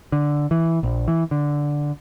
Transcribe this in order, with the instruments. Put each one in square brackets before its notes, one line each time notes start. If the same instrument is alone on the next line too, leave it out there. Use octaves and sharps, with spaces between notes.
[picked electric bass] D3
E3
A#1
E3
D3